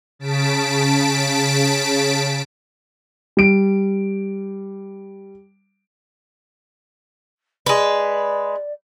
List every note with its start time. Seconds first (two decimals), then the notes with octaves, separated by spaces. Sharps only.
0.19 C#3 A5 B6 D7
3.37 G3 D7
7.66 G#3 B4 D5